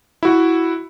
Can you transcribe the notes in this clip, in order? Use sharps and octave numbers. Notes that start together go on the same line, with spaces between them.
E4 F#4